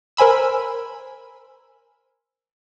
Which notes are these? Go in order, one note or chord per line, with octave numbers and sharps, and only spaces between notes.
A#4 C5 G#5 B5 E6